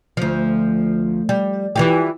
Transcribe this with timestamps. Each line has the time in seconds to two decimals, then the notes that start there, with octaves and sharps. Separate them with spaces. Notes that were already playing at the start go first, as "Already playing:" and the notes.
0.17 D2 F3
1.29 G3
1.76 E3 F4 G4